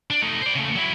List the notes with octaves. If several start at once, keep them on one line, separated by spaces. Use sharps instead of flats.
D4
A3 D#4
C5 D5
C#3 A3
F#3 E4